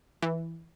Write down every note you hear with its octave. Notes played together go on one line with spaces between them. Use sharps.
E3